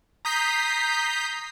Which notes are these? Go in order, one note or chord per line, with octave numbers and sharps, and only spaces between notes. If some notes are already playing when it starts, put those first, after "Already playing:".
A#5 D#6 G6 B6 C7